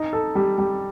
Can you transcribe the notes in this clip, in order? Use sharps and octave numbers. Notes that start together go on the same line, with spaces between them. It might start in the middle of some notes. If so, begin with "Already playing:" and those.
Already playing: D#4
A4
G3
G3